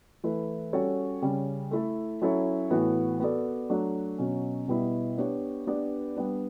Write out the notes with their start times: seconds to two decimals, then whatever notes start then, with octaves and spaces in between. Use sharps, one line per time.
0.24 E3 A3 E4 B4
0.73 G3 C#4 F#4 A4 C#5
1.22 C#3 G3 C#4
1.71 A3 E4 A4
2.22 F#3 C#4 E4 A4 C#5
2.70 A2 E3 B3 F#4
3.20 B3 F#4 A4 D5
3.70 F#3 A3 D4
4.18 B2 F#3 C#4
4.68 B2 G3 B3 E4
5.17 B3 D4 G4 C#5
5.67 B3 D4 G4 B4 D5
6.17 G3 B3 D4